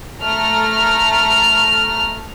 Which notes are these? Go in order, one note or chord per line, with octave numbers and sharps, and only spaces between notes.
A3 A#5 F6